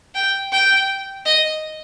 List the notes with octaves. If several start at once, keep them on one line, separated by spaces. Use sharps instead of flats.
G5
G5
D#5